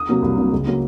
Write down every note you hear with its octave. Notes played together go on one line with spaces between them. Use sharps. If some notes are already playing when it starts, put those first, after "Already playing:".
Already playing: D#6
C3 F#3 A#3
C2
C3 F#3 A#3
C#2
C#3 F#3 A#3